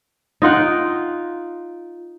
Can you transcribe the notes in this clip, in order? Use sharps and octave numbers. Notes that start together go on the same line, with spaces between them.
D#4 F4 F#5 G5